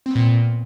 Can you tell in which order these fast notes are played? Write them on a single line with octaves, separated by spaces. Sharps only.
C4 B3 A#2